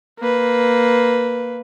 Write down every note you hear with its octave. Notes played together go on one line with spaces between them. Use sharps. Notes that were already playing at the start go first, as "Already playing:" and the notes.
A#3 B4